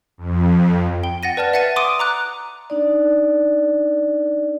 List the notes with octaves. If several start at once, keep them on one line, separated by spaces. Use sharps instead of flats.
F2
G5 G7
F#5 A6 A#6 D#7
B4 D5 A5 F6 A6
E5 F#5 A6 C#7 D#7
C6 D6 D#6 D7 D#7
A#5 D6 F#6
D4 D#4 D5